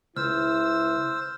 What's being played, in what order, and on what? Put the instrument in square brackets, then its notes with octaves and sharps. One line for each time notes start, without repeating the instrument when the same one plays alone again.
[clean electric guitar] C#2 [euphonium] E4 [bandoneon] C5 E6 [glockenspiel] F6